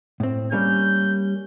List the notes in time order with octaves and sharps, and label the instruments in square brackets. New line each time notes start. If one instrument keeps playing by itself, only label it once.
[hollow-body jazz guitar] A2 C4
[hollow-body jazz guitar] G3 A#3 C#4 [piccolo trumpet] G6